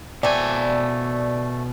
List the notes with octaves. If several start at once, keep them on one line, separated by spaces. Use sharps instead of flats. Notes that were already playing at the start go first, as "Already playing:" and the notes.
B2 A3 C4 D5 G#5